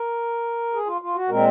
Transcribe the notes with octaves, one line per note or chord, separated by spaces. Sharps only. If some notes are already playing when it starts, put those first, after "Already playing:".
Already playing: A#4
G#4
F4
F4
F#4
A#2 G#3 C4 A#4